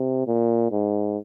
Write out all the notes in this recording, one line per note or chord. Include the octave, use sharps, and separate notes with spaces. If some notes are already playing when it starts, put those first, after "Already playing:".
Already playing: C3
A#2
G#2